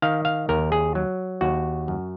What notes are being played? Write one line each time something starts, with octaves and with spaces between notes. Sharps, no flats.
D#3 F5
F5
D#2 A#4
G#4
F#3
D#2 F#4
F#2